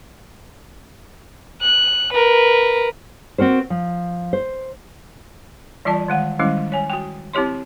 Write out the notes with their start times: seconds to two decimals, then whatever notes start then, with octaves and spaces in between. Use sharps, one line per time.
1.61 F#6
2.13 A#4 B4
3.38 C4 F#4 A#4 C5
3.70 F3
4.33 C5
5.85 E3 G3 F4 D5 A5
6.08 D#3 G#3 F#5
6.39 D#3 G3 G#3 C#4 E4
6.72 C#5 G#5
6.90 F#4 G5
7.33 C4 E4 G4 C#5 C6